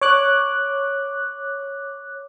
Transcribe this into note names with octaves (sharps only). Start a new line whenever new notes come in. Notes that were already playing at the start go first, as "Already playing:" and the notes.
C#5 D6 F#6